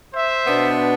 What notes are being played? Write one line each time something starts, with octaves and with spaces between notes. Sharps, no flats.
C5 E5
B2 B3 D4